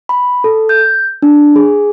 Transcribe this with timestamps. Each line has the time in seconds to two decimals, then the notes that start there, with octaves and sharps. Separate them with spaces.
0.09 B5
0.44 A4
0.69 G6
1.22 D4
1.56 G#4